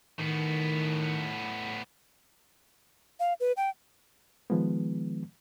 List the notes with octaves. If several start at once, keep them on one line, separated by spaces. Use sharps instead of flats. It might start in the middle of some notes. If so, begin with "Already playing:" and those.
A2 D#3 B3
F5
B4
G5
D#3 F3 G#3 B3